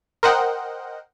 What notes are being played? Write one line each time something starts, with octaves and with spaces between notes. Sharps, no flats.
A#4 C5 D#5 F#5 G5